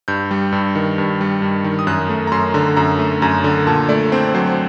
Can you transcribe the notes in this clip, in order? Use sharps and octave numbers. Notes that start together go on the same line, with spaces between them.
G2 G6
G3
G2
D#3
G2
G3
G2
D#3
D#6
F#2 F#6
A3
A#5
F#2 C6
D3 A#5
F#2 A#5
A3
F#2 A#5
D3
A#2 A5
A3 D5
C4 C5
F#3 C5